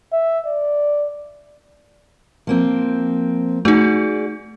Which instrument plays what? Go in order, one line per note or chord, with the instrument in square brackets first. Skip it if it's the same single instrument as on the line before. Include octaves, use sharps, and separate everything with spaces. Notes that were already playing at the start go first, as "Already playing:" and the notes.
[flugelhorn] E5
D5
[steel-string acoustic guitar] F3 A#3 C4
[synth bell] A3 D#4 [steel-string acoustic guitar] F#4 G#4 D5